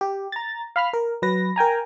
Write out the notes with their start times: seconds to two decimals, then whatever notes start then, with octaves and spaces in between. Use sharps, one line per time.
0.01 G4
0.32 A#5 A6
0.76 F5 B5 F6
0.93 A#4
1.22 F#3 B4 A#6
1.56 A#4 G5 G#5 A#5